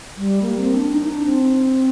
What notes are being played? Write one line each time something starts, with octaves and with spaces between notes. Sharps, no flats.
G3
A#3
C4
D4
D#4
D4
C4